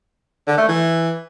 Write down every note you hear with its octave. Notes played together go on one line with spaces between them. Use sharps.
D3
A3
E3